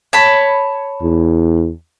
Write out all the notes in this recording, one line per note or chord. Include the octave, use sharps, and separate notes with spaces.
C#5 A5 B5
E2